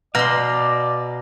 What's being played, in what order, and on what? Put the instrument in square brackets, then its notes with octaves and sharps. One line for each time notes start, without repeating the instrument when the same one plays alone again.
[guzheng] B2 C6 [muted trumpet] D5 [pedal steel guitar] F5 A#5